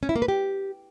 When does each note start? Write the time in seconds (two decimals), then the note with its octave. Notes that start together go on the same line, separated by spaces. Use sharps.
0.03 C#4
0.09 E4
0.16 A#3
0.22 B4
0.28 G4